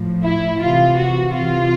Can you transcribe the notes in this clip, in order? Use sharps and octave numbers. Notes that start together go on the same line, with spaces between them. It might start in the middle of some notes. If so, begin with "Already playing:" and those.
Already playing: A2 F3
E4
C3 E3 F4
F#4
C3 E3 F4